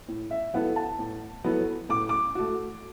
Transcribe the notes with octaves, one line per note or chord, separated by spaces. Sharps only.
A2
E5
F#3 B3 E4 A4 F#5
A5
A2
F#3 B3 E4 A4
A2 D6
D6
A3 F#4